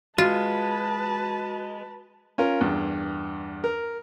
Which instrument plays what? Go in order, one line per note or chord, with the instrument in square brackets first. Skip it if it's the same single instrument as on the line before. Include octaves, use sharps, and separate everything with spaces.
[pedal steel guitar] G#3 [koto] F4 [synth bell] F#4 [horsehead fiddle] B4 A5
[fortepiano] C#4 F4 A#4
E2 G2
A#4